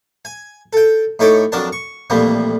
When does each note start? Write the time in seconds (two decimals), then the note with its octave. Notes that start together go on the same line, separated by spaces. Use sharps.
0.25 G#5
0.73 A4 G5
1.19 A2 D#4 A4 C#5 G5 D6
1.52 F2 F#3 D4 A#4 A5
1.72 C#6
2.10 A1 F2 A#2 G3 A#3 C4